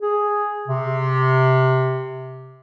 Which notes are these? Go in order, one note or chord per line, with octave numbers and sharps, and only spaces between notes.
G#4
C3